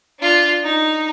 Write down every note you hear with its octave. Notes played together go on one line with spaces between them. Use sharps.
D4 F4
D#4